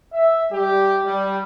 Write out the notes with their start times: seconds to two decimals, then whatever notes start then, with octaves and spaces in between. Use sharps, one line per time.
0.13 E5
0.52 G3 G4
1.05 G3